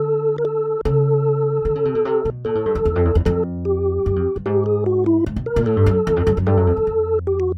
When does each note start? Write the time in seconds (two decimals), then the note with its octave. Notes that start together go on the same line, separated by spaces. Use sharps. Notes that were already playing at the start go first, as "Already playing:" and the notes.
Already playing: D3 A4
0.38 A#4
0.45 A4
0.85 C#3 A4
1.65 D3
1.75 C#3
1.85 C3
1.95 B2
2.05 C3
2.25 B2
2.45 A#2 A4
2.55 A2
2.66 G2
2.75 F2
2.85 E2
2.96 F2
3.05 E2
3.15 E2
3.25 F2 A4
3.65 G4
4.06 F#2
4.16 F2
4.36 G2
4.46 G#2 G4
4.66 G#4
4.86 F#4
5.06 E4
5.26 G#2
5.36 B2
5.46 A#4
5.56 A#2
5.66 A2 A4
5.77 G2
5.86 F#2
6.07 E2
6.17 F2
6.27 F#2
6.37 F#2
6.46 G2 A4
6.57 F#2
6.67 F2
6.77 F2
6.87 F2
7.27 G4
7.40 F#4